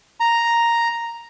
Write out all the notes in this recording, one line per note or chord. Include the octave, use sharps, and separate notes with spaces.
A#5